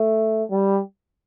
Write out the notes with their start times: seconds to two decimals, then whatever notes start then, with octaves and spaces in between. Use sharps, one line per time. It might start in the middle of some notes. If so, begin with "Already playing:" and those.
Already playing: A3
0.51 G3